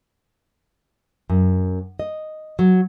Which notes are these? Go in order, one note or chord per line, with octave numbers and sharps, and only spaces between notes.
F#2
D#5
F#3